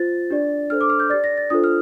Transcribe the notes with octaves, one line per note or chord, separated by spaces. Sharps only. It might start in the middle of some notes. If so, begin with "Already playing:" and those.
Already playing: F4 C5 A6
D4 G4 D5
D4 A4 C5 F6
D6
F6
G6
G4 D5 A6
A#6
A6
D4 F4 A4 C5 D#6
F6